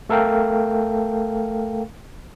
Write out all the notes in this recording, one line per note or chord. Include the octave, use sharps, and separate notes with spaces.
A3 A4 A#4 F5 G5